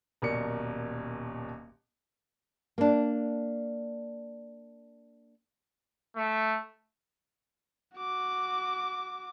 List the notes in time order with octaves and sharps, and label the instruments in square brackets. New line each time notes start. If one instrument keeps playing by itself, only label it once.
[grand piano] D#1 B1 A#4 D5 C#7
[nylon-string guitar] A#3 D4
[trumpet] A3
[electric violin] F#4 D6